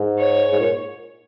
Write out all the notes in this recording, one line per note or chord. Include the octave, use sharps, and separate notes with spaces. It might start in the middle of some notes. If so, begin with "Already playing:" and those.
Already playing: G#2
C#5
G#2
A#2